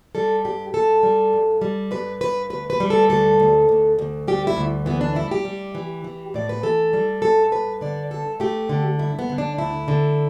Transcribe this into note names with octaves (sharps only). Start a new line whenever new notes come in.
G3 A4
G2 G4
G2 A4
G3
G2
G3
G2 B4
G2 B4
D2 B4
B4
G3
A4
D2 A4
D2
D2
D2
G3 G4
E4
D2
E3 B3
D4
G3 E4
G4
G3
E3
E3
A2 D5
B4
E3 A4
G3
G2 A4
G2 B4
D3 D5
G2 A4
A3 G4
D3
G2 E4
B3
D3
D4
D2 E4
D3